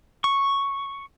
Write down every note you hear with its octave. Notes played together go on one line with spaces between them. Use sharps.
C#6